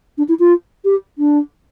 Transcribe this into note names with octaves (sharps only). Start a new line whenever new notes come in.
D4
E4
F4
G4
D4